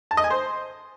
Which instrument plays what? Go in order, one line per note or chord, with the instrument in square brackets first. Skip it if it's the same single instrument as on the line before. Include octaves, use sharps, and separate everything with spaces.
[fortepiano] A5
D#5
G#5
C5